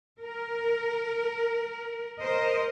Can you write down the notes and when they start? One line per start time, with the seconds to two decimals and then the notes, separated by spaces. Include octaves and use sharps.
0.20 A#4
2.19 A#4 C5 D#5